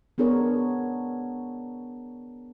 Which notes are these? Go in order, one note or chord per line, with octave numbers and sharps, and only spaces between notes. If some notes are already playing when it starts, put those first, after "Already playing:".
B3 D4 G#4 A#4 C#5